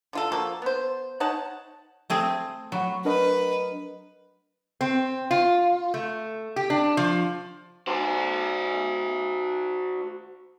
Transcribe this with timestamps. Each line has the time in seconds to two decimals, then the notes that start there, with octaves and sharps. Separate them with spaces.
0.13 D3 F4 A4
0.32 F3 A#3 F#4 A4
0.62 B3 C5
1.20 D#4 C#5 F#5 A5
2.10 A3 C4 G#4
2.72 F#3 F#5 B5 C#6
3.05 D4 A#4 B4 D#5
4.81 C4
5.31 F4
5.94 A3
6.56 G4
6.70 D4
6.97 F3
7.88 F#4 C5